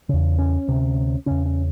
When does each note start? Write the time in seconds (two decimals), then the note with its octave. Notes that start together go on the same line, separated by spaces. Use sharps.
0.09 E2 C#3
0.39 C#4
0.68 D2 C3
1.26 E2 C#3 C#4
1.46 C#4